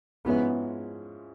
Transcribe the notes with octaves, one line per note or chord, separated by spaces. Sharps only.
G#2 F3 G#3 B3 C#4 E4